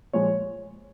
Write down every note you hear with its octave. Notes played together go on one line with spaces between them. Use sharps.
A#2 F3 G#3 C#5